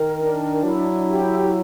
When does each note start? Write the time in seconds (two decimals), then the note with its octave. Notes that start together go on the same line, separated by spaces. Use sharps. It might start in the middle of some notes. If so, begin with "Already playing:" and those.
Already playing: D#3 A#4
0.18 D4
0.63 F#3 E4
1.09 G4